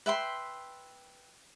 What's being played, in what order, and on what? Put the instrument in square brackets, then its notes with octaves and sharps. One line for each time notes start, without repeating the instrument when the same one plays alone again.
[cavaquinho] B4 E5 G5 C6